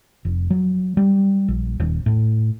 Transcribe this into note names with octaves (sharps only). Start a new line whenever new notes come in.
F1
F#3
G3
A#1
D#1
A2